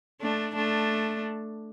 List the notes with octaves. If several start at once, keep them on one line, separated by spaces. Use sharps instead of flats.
A3 D4
A3 D4